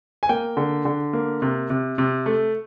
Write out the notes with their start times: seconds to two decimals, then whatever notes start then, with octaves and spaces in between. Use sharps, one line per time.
0.23 G#5
0.29 A#3 G5
0.57 D3
0.85 D3
1.13 A#3
1.42 C3
1.70 C3
1.98 C3
2.26 A3